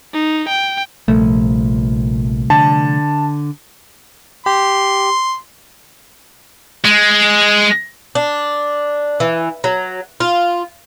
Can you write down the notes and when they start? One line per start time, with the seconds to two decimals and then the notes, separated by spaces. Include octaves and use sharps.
0.14 D#4
0.49 G5
1.08 A#1 C3 F3 G3 A3
2.50 D3 A5
4.46 G4 C6
6.85 G#3
8.15 D4
9.20 E3
9.64 F#3
10.20 F4